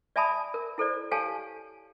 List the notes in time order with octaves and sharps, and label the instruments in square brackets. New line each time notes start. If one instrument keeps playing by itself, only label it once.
[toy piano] D5 E5 G#5 A5 B5 D#6
A#4
E4 A4 C5 D5
G4 A4 C#5 F5 G#5 A5